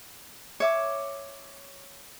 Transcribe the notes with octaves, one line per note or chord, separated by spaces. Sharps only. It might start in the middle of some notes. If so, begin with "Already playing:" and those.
C#5 E5 D6